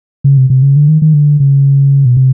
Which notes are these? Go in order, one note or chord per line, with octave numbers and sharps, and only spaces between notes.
C#3
C3
C3
C#3
D3
D#3
D#3
D3
C#3
B2
C3